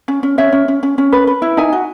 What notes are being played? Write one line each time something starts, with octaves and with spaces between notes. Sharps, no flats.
C#4
C#4
C#4 C#5 E5
C#4
C#4
C#4
C#4
B4
B4
E4
D#4 E5 G#5
F#4